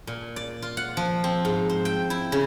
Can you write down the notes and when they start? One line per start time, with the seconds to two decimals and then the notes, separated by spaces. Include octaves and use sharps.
0.07 A#2
0.36 D5
0.62 F4
0.77 F#5
0.97 F3
1.24 C4
1.45 G#2
1.69 C5
1.85 G5
2.10 E4
2.32 C#3